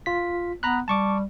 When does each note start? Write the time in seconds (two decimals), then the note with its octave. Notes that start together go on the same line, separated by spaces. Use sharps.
0.06 F4 B6
0.63 B3 A#5 B5 F#6
0.88 G3 A5 C#6 D6